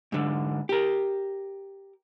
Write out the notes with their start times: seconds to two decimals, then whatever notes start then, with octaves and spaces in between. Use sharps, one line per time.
0.12 G#2 D3
0.69 G4 A#4